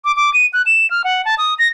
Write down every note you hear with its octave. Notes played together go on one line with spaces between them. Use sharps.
D6
D6
D#7
F#6
E7
F6
F#5
A5
D#6
A#6